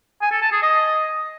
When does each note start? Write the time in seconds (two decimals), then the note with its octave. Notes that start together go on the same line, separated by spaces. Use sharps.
0.21 G#5
0.31 A4
0.42 A5
0.52 G#4
0.62 D#5